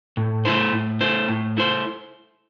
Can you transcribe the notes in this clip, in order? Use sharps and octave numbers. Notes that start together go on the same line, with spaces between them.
A2
A3 E4 C5
A2
A3 E4 C5
A2
A3 E4 C5